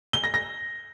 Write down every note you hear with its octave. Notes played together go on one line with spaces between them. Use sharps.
G7
A#6
A#6